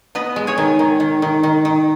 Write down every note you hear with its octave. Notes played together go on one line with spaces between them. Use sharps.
B3 B4 D#5
G#3
G#4 C#5
D#3
D#3
D#3
D#3
D#3
D#3